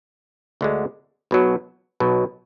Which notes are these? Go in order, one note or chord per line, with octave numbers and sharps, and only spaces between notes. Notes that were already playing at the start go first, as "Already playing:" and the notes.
D2 D3 G#3
B1 B2 F#3
B1 B2 F#3